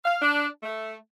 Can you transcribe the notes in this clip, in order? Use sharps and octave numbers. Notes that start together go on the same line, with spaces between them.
F5
D4
A3